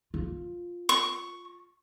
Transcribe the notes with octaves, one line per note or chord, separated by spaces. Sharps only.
F4
C#6